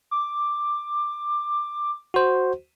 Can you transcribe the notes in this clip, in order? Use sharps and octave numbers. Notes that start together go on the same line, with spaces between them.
D6
F#4 C5